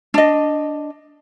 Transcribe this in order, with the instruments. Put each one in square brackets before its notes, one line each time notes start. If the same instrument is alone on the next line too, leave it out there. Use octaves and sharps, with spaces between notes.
[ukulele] D4 D#5